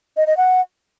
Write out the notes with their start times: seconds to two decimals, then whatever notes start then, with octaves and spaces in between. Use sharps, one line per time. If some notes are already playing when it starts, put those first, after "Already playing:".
0.17 D#5
0.27 D#5
0.37 F#5